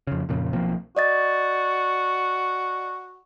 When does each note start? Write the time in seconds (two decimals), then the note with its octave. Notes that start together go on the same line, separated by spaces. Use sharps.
0.07 F2 C#3
0.29 F2 A#2 C#3
0.53 B1 F3 A#3 C4
0.96 F#4 D5 D#5 A6